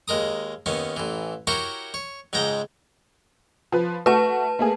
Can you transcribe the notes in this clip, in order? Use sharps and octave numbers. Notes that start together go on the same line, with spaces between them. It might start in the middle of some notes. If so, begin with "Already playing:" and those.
D#2 G#3 A#4 D#6
D#2 D#3 B3 C#4
A1 E3
E4 F#4 G4 A#4 C#5
C#5
C#2 G#2 G#3 G5 A#5
F3 B4
A3 F#4 B4 A5 C#6
A3 A#3 G#4